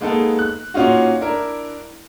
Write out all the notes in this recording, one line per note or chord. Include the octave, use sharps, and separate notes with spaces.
G#3 A#3 B3 D#4 A4
F#6
A#2 C#4 D#4 F4 F#4
D4 E4 A#4